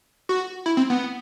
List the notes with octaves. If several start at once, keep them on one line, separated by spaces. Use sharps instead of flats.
F#4
E4
C4
B3